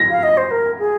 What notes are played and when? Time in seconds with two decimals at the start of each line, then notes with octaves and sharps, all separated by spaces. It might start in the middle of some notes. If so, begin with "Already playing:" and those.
Already playing: A#6
0.11 F5
0.23 D#5
0.37 C5
0.51 A#4
0.79 G#4